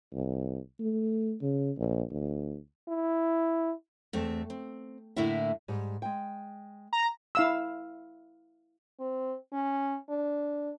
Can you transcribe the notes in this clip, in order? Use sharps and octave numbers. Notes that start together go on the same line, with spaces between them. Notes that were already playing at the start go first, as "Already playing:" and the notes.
C2
A3
C#3
A#1
D2
E4
E2 A3 C4
C4
A2 D3 A3 A#3 E4 E5
G#2 G3
G#3 G5
A#5
E4 F5 E6
C4
C#4
D4